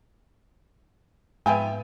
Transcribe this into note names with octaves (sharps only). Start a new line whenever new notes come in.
G#2 F3 G#3 B3 B4 E5 G5 G#5